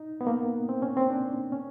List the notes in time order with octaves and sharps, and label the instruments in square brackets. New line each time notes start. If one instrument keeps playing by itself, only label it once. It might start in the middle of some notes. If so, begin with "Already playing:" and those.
Already playing: [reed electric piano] D#4
B3
A#3
C4
C#4
C4
D4
C#4